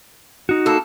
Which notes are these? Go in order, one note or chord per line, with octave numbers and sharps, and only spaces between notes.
D#4 F#4
A#3 A4